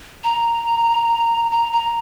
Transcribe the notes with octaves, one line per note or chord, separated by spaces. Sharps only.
A#5
A#5
A#5